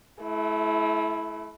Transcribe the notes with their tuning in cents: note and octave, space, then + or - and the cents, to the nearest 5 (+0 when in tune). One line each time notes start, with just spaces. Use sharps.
A3 -35 E4 +5